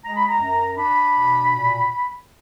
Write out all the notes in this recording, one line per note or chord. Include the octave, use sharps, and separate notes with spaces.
G#3 A#5
B5
A#5
F#2
D4 B5
B2
A#2